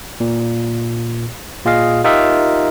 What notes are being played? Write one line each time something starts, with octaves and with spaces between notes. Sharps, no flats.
A#2
A#2 F4 G#4 D#5 F5
D#4 F4 G4 A#4 D#5 E5